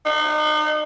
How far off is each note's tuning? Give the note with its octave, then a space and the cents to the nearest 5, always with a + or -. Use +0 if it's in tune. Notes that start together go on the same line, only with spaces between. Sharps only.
D#4 -35